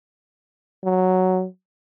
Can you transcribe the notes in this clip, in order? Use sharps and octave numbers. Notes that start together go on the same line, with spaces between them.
F#3